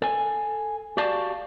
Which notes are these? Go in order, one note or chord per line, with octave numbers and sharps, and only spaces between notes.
A4 G#5
F#4 G4 D5 F5 A5